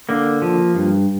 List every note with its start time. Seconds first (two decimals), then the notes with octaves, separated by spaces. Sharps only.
0.09 D3 A#3
0.42 F3
0.75 G2